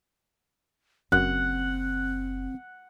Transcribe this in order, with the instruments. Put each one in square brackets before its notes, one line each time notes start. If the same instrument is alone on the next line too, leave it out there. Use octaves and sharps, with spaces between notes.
[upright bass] F#1 [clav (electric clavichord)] F#2 [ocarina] C4 [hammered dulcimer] F#5